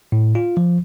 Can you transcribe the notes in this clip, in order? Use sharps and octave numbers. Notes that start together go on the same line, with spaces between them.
A2
F4
F3